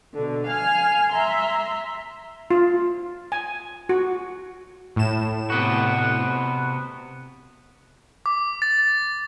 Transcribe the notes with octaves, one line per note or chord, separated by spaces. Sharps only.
B2 D3
F5 G#5 F6
E5 A#5 C6
F4
G#5
F#4
A2 E7
C3 B3 F#4
D6
A6